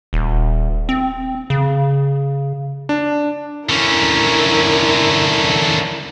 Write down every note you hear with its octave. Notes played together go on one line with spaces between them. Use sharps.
D#1
C4
C#3
D4
D3 C#4 E4 A#4